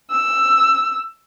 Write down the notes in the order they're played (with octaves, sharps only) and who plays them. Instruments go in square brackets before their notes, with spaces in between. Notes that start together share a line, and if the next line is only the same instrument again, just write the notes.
[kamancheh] E6